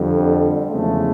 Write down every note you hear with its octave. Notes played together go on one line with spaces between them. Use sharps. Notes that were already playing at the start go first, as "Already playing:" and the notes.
Already playing: F2 D3 G3
E2 C#3 F3 G#3 A3